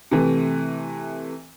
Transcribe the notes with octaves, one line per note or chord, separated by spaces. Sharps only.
C3 E3 A3